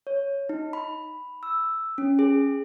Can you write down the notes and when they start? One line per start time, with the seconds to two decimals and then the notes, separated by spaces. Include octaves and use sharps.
0.07 C#5
0.49 D#4
0.73 B5
1.43 E6
1.98 C#4
2.19 G#4